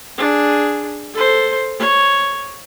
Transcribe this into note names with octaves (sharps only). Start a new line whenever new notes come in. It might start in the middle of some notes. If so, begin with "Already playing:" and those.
D4 G#4
A4 C5
C#5